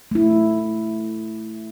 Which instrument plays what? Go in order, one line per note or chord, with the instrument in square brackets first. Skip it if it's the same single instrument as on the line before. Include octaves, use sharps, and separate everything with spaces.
[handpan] A3 E4